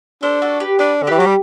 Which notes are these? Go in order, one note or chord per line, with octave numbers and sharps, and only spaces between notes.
D4 A4 C5
F#4 A4
G4 B4
D4 B4 D5
D3
E3 G4 B4
F#3 G4
G3